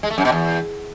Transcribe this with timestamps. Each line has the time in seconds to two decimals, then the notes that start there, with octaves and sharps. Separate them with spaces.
0.03 G#3
0.10 A3
0.18 F#2
0.25 B2
0.32 E2